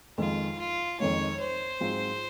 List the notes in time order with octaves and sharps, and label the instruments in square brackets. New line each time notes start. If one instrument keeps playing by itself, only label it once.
[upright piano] F2 D#3 G#3 [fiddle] F4
[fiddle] F4
[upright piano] F2 D#3 G#3 [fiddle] C#5
[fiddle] C5
[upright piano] G#2 F#3 C4 F4 G#4